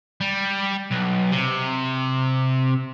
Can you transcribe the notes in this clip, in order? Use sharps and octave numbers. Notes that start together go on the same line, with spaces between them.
G3
B1
C3